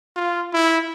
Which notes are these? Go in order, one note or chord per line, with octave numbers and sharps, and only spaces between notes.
F4
E4